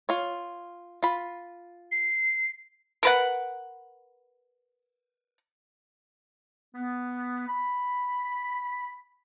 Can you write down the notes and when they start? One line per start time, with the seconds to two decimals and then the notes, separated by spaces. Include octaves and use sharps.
0.09 F4 C#5
1.03 F4 B5
1.92 C7
3.03 A#4 B4 F#5
6.75 B3
7.48 B5